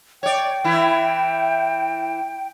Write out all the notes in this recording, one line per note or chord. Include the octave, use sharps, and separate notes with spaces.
C#5 D5 G5
E3 E4